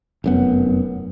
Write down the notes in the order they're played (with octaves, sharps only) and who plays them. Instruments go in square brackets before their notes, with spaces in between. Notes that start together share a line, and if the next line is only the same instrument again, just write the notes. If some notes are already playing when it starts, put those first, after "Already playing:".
[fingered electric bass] F1 F#2 B3